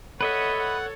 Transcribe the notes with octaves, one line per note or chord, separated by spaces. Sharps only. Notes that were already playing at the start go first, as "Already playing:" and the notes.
A4 B4 C#5 D#5 E5 F#5
F#5